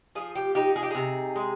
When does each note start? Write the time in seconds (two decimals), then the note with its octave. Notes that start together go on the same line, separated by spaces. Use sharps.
0.15 F3 G#4
0.35 G4
0.55 D#4 G4
0.76 G#4
0.83 G4
0.91 C3 G#4
1.36 G#3